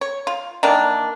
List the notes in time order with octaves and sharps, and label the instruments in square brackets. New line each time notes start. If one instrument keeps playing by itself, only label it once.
[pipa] C#5
F4
D#3 E3 A#3 D4